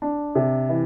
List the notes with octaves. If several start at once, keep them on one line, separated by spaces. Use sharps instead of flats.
D4
C3
E3